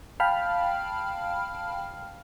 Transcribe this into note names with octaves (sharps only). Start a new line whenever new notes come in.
F5 G5 A5 B5 F6